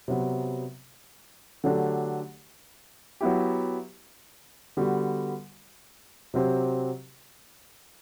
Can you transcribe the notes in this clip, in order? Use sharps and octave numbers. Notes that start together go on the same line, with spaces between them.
C3 F#3 B3
D3 F#3 A3 D4 G4
F#3 B3 E4 G4
D3 G3 B3 F#4
C3 F#3 C4 G4